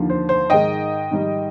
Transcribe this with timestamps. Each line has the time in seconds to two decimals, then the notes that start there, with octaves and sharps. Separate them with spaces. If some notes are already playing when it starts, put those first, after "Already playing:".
Already playing: D#2 D3 F3
0.10 C5
0.29 C5
0.50 G#2 D#3 G#3 D#5 G5
1.11 G#2 D#3 G3